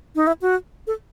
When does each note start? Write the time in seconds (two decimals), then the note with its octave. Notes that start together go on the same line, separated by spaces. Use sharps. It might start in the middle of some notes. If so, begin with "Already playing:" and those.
0.15 D#4
0.27 E4
0.42 F#4
0.87 A4